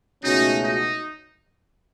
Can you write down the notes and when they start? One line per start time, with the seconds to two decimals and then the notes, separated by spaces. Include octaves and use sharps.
0.23 C#2 B2 A3 C#4 D#4 F#4
0.63 D#4